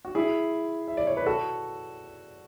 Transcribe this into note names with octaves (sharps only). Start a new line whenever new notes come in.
F#4
E4 G#4
E5
D5
C#5
B4
F#4 A4